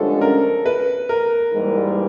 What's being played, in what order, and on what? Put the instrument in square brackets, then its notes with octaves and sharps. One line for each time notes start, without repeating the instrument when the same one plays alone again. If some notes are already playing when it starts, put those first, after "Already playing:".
Already playing: [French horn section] G2 D3 F3 G#3 C#4 [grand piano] A4
[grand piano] A#4
B4
A#4
[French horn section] G#2 E3 G3 A#3